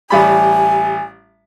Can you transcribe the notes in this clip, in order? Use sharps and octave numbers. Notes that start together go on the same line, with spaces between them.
A1 G3 G#5 B5